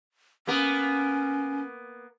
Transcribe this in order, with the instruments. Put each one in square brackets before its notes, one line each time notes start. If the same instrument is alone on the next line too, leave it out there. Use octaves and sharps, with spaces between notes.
[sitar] A#3 B3 A#4 [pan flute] C#4